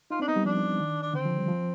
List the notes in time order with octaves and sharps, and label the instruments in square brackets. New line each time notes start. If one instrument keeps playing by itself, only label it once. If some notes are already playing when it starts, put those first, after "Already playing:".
[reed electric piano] D#4 [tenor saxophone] F4
[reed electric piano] C4 [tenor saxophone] D4
[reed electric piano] B3 [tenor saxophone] D#4
[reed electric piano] G3
[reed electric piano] F3 [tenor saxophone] D4
[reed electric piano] D#3
[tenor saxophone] D4
[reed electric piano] D3 [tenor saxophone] C4
[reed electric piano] F3
G3
F3